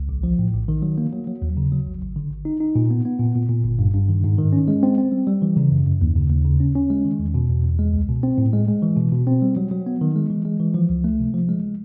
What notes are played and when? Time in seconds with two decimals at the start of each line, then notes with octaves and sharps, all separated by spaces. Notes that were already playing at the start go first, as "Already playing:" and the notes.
Already playing: C#2
0.09 A#1
0.23 F3
0.39 A2
0.54 A#1
0.68 D#3
0.82 F#3
0.98 A#3
1.13 F#3
1.27 F#3
1.42 D#2
1.57 C#3
1.72 F#3
1.87 G#1
2.02 G#1
2.16 D3
2.31 G#1
2.45 D#4
2.60 D#4
2.75 A#2
2.91 B3
3.05 B3
3.20 A#2
3.35 A#2
3.49 A#2
3.64 G1
3.79 G2
3.94 G2
4.09 D#3
4.24 G#2
4.38 D#3
4.53 C#4
4.68 G#3
4.83 C4
4.98 C4
5.12 G3
5.27 G3
5.42 E3
5.56 C#3
5.71 F#2
5.86 F#2
6.01 D#2
6.16 C#3
6.30 D#2
6.45 C#3
6.60 C#4
6.75 C#4
6.90 G#3
7.05 D#3
7.19 E2
7.34 B2
7.49 E2
7.64 E2
7.79 G#3
7.93 C#2
8.09 B2
8.23 C4
8.38 A2
8.53 G#3
8.68 G#3
8.82 E3
8.97 B2
9.12 B2
9.27 C4
9.42 G3
9.57 F#3
9.71 F#3
9.86 B3
10.01 D#3
10.16 G#3
10.30 E3
10.45 G#3
10.60 E3
10.74 F3
10.89 C#2
11.04 A3
11.19 C3
11.34 F3
11.49 G#3